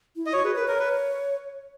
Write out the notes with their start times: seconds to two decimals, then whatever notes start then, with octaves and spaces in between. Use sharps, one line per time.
0.16 E4
0.26 D#5
0.33 F#4 C#5
0.44 G#4 B4
0.56 A#4 B4
0.67 A#4 C#5
0.79 B4